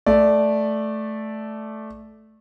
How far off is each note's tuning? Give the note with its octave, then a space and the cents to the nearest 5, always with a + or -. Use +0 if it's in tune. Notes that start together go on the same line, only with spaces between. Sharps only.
A3 -10 D5 +0